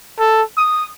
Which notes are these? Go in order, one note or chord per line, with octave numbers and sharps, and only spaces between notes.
A4
D#6